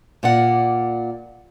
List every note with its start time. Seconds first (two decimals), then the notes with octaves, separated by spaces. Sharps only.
0.23 A#2 D5 F#5